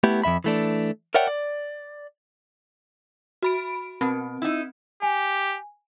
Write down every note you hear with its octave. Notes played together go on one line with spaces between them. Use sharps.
A3 B3 E4 G4
F2 G#2 E5 B5
E3 A3 D4
A#4 C#5 D5 E5 F#5 G5
D5
F#4 B5 D7
B2 C4
D#4 E4
G4 G#5